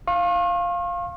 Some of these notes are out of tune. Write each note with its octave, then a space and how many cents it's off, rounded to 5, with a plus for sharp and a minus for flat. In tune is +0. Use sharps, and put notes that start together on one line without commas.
F5 +0 C#6 -45